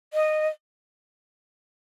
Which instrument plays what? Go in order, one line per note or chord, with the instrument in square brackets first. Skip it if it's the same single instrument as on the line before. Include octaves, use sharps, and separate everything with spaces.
[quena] D#5